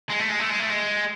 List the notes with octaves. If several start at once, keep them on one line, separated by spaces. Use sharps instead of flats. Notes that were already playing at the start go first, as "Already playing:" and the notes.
G#3
A3
G#3
A3
G#3
A3
G#3